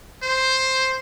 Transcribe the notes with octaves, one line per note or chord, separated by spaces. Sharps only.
C5